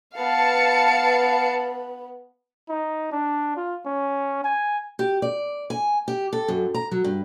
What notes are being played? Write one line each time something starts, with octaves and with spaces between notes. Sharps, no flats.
B3 B4 F5 A5 C#7
D#4
D4
F4
C#4
G#5
G4
D5
G#5
G4
A4
F#2
A#5
F#3
G2